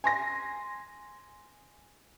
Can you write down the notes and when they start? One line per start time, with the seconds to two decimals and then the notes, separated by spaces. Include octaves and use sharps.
0.04 G#5 C6 A#6